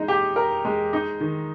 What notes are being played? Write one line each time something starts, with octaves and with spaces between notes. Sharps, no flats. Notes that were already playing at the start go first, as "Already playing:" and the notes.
Already playing: G#3 D#4
G4
A#4
G#3
D#4
D#3